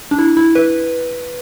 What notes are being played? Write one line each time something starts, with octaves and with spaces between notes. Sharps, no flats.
D4
E4
E4
B4